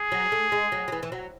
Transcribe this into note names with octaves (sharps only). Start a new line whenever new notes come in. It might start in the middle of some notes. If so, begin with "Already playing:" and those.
Already playing: G#4
F#3
A3
G#3
F#3
F#3
E3
E3
F#3